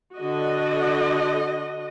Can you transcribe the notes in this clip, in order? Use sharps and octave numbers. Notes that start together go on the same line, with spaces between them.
D3 F#4 D#5